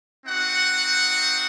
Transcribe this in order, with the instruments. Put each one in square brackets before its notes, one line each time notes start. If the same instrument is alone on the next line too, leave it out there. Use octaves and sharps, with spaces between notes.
[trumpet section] C4 D#4 F#4 F#5